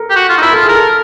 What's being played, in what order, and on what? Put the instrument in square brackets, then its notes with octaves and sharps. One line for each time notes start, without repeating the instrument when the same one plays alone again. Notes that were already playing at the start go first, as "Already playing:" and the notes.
Already playing: [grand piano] A4 A#4
[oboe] G4
F#4
F4
D#4
[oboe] E4 [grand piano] A#4
[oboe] F4 [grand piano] A4
[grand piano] G#4
[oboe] A#4
[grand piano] A4